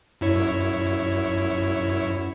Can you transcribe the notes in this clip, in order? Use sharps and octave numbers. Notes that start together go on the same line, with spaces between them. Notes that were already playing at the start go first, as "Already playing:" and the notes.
F#2 E4 C#5